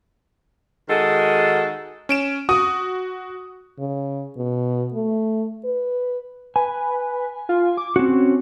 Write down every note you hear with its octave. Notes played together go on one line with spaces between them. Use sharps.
D#3 G#3 F#4 G#4 A4
C#4 D7 E7
F#4 D#6
C#3
B2
A3
B4
B4 G#5
F4
D6
C4 C#4 F#4